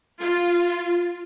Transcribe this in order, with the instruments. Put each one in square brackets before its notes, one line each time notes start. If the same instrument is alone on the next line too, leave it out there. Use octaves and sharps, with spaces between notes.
[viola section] F4